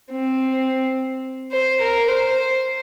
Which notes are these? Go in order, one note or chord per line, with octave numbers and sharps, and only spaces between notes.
C4
C5
A#4
C5